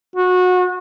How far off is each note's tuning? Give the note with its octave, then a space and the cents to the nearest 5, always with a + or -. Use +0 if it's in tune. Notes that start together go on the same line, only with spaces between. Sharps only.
F#4 -25